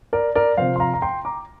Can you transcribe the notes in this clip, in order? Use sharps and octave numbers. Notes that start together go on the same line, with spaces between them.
A#4 D5
A#4 D5
C3 F3 C5 F5
C6
F5 A#5
A#5
G5 C6
A#5 D6